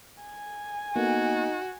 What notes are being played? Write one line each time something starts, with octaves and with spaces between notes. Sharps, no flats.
G#5
A#3 B3 D#4 F#4 A4